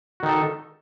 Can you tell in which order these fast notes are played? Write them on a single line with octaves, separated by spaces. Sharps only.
F#4 D#3 D#4 A4